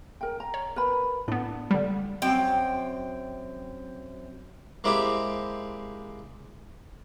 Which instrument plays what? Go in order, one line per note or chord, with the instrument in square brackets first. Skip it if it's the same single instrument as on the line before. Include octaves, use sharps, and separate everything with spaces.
[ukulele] A#4 G5
A#5
[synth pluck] C#5
[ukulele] A#4 B4 B5
[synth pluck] A2 B3 [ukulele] D4
[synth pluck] D3 G3
[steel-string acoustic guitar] F#2 C4 G5
[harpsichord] G#3 A#3 C4 E4 G4